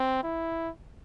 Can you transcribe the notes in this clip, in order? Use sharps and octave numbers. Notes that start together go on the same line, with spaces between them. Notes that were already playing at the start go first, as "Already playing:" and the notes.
Already playing: C4
E4